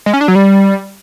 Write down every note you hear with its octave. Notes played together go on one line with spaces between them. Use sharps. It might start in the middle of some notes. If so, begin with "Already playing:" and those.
G#3
C#4
D4
F#3
G3